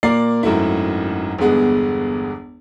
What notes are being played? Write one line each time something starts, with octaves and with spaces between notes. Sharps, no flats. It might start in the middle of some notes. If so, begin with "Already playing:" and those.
A#2 A#3 A#4 D5 C7
G#1 F#2 A3 E4
G1 E2 G#3 B3 G#4